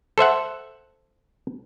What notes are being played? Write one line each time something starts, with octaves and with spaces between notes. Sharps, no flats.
A4 C5 E5 F#5